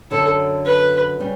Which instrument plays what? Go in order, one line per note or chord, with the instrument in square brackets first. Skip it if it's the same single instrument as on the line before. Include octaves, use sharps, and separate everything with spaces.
[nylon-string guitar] F#2 D3 F#3 [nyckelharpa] A4
[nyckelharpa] B4
[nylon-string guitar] C#3 G3 C#4